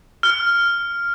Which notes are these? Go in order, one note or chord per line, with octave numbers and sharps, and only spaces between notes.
F6